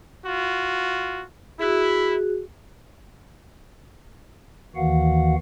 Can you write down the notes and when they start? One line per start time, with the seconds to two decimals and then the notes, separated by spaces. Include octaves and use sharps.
0.25 F4 F#4
1.59 E4 F#4 G#4
4.76 D#2 D#3 E3 F#4 F5 F#5